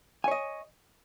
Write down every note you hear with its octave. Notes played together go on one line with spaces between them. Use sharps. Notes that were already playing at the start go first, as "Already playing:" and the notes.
C#5 D#5 G#5